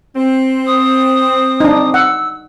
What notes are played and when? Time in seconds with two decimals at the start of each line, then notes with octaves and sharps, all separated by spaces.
0.16 C4
0.67 D#6
1.60 D4 D#4
1.94 F#5 E6